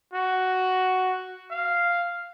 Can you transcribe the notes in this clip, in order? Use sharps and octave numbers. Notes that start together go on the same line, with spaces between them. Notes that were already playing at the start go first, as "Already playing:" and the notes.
F#4
F5